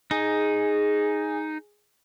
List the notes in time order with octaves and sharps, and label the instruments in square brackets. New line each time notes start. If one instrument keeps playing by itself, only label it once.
[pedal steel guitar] D#4 [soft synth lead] G#4